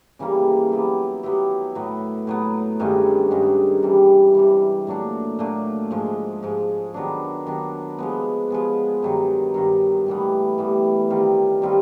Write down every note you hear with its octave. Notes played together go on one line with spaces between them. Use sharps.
C#3 E3 G3 A#3
F#3 B3 E4 G4
F#3 B3 E4 G4
A2 F#3 B3
A2 F#3 B3
G2 D#3 G#3 C#4
G2 D#3 G#3 C#4
C3 E3 G3
C3 E3 G3
A#2 F#3 A3 D4
A#2 F#3 A3 D4
G#2 F3 G#3
G#2 F3 G#3
D#3 F#3 B3 D4
D#3 F#3 B3 D4
F3 G#3 B3
F3 G#3 B3
G2 D#3 F#3
G2 D#3 F#3
A2 E3 G3 B3
A2 E3 G3 B3
D#3 G3 C4 F4
D#3 G3 C4 F4